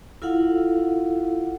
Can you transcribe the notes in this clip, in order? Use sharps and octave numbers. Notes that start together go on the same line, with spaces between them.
E4 F4 A4 F5 F#5